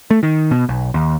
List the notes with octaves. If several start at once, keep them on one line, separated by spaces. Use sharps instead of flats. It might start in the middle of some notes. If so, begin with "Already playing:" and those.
A3
D#3
B2
B1
D#2